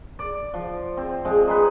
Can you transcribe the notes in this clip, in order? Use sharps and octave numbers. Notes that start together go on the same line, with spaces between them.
D5
F3
C4
F3 G#3 C4
D#4 G#4 B4